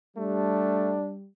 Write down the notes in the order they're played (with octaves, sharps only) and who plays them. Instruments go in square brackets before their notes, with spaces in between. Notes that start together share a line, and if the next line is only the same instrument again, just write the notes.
[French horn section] G3 [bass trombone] A3 [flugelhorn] D4